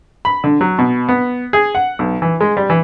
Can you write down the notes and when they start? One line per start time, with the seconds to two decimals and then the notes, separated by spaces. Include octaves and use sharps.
0.25 B5
0.44 D3
0.61 F#3
0.79 B2
1.09 B3
1.53 G#4
1.75 F#5
1.99 B1
2.22 E3
2.41 G#3
2.57 G3
2.70 E3